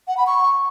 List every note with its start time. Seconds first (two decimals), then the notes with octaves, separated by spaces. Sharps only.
0.08 F#5
0.17 B5
0.27 C#6